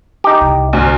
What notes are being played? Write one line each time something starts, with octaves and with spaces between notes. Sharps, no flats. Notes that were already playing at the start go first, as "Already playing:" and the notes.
D#4 G4
C2
D2